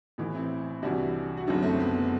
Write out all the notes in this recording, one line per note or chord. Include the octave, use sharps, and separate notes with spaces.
A1 A2 E3
C4 E4
C2 C3 E3 D4 F#4
F#4
F#1 F#2 D3 C4 E4
A3 C4
B3